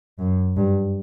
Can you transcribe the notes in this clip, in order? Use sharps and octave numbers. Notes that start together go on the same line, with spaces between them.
F#2
G2